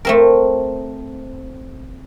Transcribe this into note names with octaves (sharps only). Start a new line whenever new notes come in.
A3 C4 A#4